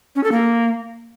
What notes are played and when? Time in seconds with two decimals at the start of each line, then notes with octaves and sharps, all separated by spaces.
0.16 C#4
0.24 A4
0.32 A#3